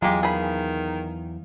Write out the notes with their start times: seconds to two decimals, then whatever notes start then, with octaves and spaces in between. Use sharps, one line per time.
0.02 E2 E3 F#3 G#3 A#3 F4 G4 F5
0.23 D#3 G#4 B5